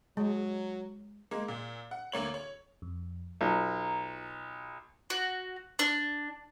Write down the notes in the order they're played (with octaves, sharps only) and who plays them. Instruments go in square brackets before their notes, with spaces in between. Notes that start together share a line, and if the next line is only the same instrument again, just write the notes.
[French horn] F#3 [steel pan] G#3
[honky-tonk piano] G#3 A#3
A#2
F#5
D2 A#3 C#5 F#7
C#5
[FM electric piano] F2
[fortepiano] B1 [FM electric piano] F4 A#5
[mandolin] F#4
D4